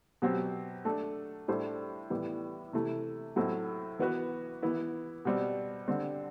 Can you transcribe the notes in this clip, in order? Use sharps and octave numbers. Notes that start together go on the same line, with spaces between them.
B2 F#3 C4 G4
A3 D4 A4
A2 G3 D4 A4 C5
A2 E3 G3 B3
C3 E3 A3 E4
A2 F#3 A3 C4 E4
E3 B3 F#4 B4
E3 B3 E4
B2 G3 C4
D3 G3 C4